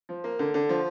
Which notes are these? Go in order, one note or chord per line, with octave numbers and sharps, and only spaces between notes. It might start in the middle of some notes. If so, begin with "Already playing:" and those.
F3
A#3
D3
D3
F3